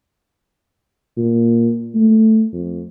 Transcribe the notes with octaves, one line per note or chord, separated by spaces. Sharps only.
A#2
A3
F2